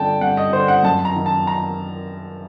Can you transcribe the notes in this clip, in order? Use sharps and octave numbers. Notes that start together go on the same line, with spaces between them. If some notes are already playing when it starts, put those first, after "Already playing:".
Already playing: G2 D3 G5 A5
G2 F#5
D#5
D3 C5
F#5
F#2 A5
A#5
D#3
A5
A#5